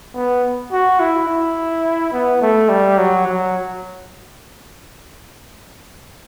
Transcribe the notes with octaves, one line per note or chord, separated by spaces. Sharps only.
B3
F#4
E4
E4
B3
A3
G3
F#3
F#3